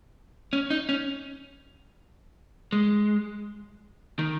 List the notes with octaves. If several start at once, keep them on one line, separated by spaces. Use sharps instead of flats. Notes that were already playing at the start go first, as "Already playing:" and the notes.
C#4
D#4
C#4
G#3
D#3